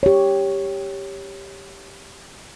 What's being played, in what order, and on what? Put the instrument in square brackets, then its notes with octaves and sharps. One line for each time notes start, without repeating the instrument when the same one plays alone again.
[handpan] G4 C#5